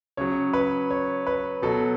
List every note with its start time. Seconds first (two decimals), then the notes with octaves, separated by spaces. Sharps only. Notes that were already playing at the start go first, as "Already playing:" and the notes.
0.17 C#3 F#3 C#5
0.53 B4
0.90 C#5
1.27 B4
1.62 B2 F#3 A4